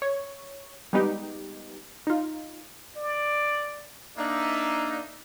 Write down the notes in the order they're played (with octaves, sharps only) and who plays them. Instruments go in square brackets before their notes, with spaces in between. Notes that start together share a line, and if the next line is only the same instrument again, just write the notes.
[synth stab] C#5
G3 G#3 B3 D#4 G4
D#4 F4
[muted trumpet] D5
[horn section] A#3 D4 D#4 [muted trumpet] E5